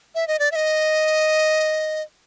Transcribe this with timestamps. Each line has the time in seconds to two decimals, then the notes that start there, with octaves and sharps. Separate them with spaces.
0.15 E5
0.28 D#5
0.39 D5
0.51 E5
0.55 D#5